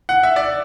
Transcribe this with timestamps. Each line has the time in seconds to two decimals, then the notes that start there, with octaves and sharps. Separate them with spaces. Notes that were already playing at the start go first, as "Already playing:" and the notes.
0.09 F#5
0.23 E5
0.36 D5